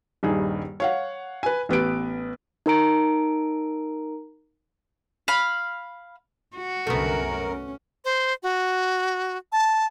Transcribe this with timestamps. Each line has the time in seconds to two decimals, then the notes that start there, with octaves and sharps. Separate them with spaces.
0.23 D#1 G2 D#4 G#4
0.80 C#5 F5 F#5
1.43 B4 G#5
1.69 A1 B3 B4 D7
2.66 D#4 A#4 A#5 D7
5.28 F5 B5
6.57 F#4
6.87 C2 F#2 D3 A3 B3 A#4
7.26 C#4
8.05 C5
8.43 F#4
9.52 A5